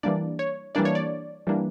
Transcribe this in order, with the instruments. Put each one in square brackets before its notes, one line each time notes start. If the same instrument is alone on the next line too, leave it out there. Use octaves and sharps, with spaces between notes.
[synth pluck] E3 G3 A#3 D4 D5
C#5
E3 G3 A#3 D4 D5
C#5
D5
E3 G3 A#3 D4